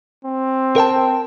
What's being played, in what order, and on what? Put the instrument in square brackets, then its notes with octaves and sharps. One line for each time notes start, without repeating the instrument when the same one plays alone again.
[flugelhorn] C4
[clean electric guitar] A#4 G5 A5